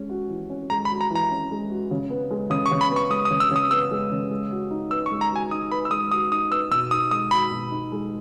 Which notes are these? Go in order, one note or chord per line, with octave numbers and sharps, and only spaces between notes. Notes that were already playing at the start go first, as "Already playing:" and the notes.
Already playing: G#3 C#4
F#4
E3
C#4
G#3 A#5
B5
F#4
A#5
E3
A#5
C#4
G#3
F#4
C#3
B3
G#3
C#3 D#6
C#6
C#3
B5
B3
C#6
G#3 D#6
D#6
C#3
E6
C#3 D#6
B3 E6
G#3
C#3
G#3
F#4
D#4
B4 E6
C#6
G#3
A#5
F#4 G#5
D#4 D#6
B4 B5
E6
G#3 D#6
F#4 D#6
D#4 D#6
B4 E6
B2 E6
D#4 D#6
G#3 D#6
F#4 B5
B2
D#4
G#3